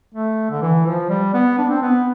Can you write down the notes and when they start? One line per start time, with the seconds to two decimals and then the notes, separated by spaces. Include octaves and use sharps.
0.14 A3
0.50 D3
0.62 E3
0.86 F3
1.10 G3
1.34 B3
1.58 D4
1.69 C4
1.82 B3